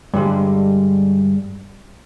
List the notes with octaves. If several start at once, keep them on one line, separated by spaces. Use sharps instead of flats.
G2 D3 G3 G#3